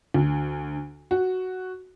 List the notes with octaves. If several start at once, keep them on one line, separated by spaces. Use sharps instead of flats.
D2
F#4